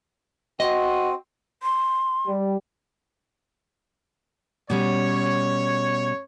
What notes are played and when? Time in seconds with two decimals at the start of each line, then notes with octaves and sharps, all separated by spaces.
0.60 C4 F#4 D#5
1.63 C6
2.26 G3
4.70 B2 G3 C#4 C#5